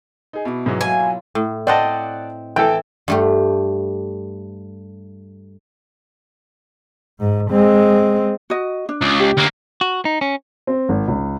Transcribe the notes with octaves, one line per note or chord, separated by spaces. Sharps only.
D#4 G#4
B2 E4 D6
G#2 E3 F#3
B2 F#3 A#3 F5 G#5
E4 F4
A2
C4 C5 D5 D#5 F#5 A5
E3 A4 G5
G2 A3 G4
G#2
G#3 C4
F#4 D#5
D4
C#2
G4
D2 A#3
F#4
D#4
C#4
C4
G#1
C#2